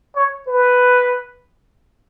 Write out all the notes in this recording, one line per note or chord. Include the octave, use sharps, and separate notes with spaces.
C#5
B4